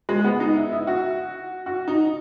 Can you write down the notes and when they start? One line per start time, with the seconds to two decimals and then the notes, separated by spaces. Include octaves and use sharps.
0.09 G#3
0.24 B3
0.40 D#4
0.55 E4
0.72 E4
0.87 F#4
1.66 F#4
1.88 D#4